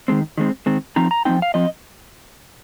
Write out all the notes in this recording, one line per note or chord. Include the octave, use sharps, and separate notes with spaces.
D#3 G#3 C4
D#3 G#3 C4
D#3 G#3 C4
F3 C4 D#4 A#5
A#5
F3 C4 D#4 G5
F5
F3 C4 D#5